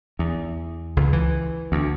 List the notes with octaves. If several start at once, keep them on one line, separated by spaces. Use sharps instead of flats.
E2
C#2
E3
D2